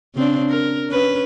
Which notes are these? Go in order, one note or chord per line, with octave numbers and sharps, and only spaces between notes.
C#3 C4 D4
A#4
C#4 B4